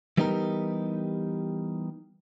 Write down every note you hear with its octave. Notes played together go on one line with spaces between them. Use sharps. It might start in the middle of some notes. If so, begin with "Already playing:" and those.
E3 G3 B3 D#4 G4 A#4